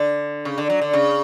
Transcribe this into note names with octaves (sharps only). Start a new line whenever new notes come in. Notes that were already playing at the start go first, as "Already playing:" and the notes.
Already playing: D3
C#3
D3
F#3
D3
C#3